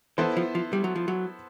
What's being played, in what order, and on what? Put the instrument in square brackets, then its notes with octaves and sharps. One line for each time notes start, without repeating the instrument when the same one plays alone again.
[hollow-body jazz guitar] E3 [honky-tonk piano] B3 E4 A4 C5
[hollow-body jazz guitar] F3
F3
G3
F#3
F3
F#3